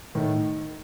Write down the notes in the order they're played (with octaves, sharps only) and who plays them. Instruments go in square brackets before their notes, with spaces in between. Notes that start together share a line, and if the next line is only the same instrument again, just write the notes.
[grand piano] A2 [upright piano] D#3